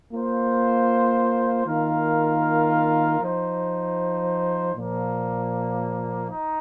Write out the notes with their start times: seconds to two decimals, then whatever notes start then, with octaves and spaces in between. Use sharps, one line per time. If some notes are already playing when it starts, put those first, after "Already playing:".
0.12 A#3 F4 C5
1.66 D#3 A#3 F4 A#4
3.20 F3 D#4 C5
4.74 A#2 F3 A#3
6.29 D#4